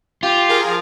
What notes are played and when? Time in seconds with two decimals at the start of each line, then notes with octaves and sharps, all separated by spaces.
0.23 F4 G4
0.49 G#4 A#4 F5
0.67 F3